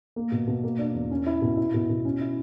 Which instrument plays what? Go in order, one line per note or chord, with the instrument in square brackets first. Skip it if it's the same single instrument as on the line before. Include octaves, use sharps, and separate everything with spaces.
[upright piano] A#3
B2
B2
A#3
D4
E2
C#4
E4
B2
E4
B2
B2
C#4
E4